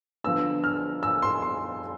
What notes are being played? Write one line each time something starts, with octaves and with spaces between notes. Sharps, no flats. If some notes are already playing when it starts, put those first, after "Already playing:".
D3 F3 B3 D4 E6
F6
E6
C6
C6